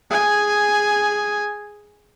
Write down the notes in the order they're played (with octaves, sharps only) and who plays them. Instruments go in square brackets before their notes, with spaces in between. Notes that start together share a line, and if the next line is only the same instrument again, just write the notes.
[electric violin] G#4 G#5